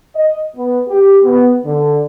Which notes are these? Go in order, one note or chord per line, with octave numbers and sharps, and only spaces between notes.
D#5
B3
G4
B3
D3